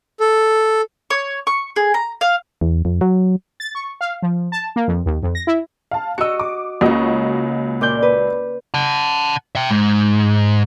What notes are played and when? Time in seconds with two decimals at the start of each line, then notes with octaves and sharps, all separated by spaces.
0.20 A4
1.10 C#5
1.47 C#6
1.76 G#4
1.94 A#5
2.21 F5
2.61 E2
2.85 F2
3.01 F#3
3.60 A6
3.75 C#6
4.01 F5
4.22 F3
4.52 A5
4.76 A#3
4.88 F2
5.06 D#2
5.23 F2
5.35 A#6
5.47 E4
5.91 F5 A5
6.18 F#4 D#5 E6 C#7
6.39 D6
6.81 C#2 C#3 A#3 F#4 D#5
7.81 A#2 D5 G6
8.02 B4
8.74 F#5 A5
9.55 E5 G5
9.70 G#2